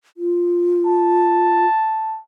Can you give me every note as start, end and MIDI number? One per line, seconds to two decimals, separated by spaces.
0.17 1.66 65
0.86 2.20 81